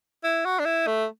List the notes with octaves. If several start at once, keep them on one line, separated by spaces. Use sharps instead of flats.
E4
F#4
D4
E4
A3